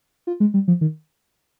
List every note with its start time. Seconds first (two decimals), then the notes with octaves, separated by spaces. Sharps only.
0.27 F4
0.40 G#3
0.54 G3
0.68 F3
0.81 D#3